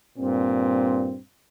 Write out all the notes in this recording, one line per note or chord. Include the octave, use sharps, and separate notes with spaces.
G2 A#2 C4